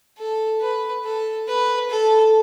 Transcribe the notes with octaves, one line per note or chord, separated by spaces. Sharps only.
A4
B4
A4
B4
A4